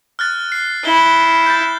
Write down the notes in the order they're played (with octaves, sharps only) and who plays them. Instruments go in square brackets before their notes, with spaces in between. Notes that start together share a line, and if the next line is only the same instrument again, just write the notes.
[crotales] F6 F#6 A6
C7
[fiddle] E4 [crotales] G7
[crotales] G6 A6